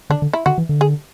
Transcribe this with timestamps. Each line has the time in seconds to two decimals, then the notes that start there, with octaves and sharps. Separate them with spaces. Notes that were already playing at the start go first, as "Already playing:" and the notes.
0.10 D3 D4
0.22 D3
0.33 E4
0.46 D3 F#4
0.58 E3
0.69 D3
0.81 G#4